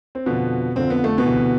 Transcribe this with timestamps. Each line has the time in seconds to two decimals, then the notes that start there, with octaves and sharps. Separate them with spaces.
0.15 C4
0.26 F2 B2 D3 F3 B3
0.76 F2 D3 F3 C4
0.90 B3
1.04 A3
1.18 B2 B3
1.25 D2 C3 E3